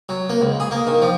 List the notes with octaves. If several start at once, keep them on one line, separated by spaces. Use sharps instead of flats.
F#3
A#3
C#2
G#4
A#3
D#3
F3